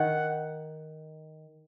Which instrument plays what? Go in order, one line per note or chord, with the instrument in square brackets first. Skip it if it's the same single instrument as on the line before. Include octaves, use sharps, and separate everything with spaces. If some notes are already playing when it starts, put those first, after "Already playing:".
Already playing: [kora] D#3 [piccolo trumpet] F#5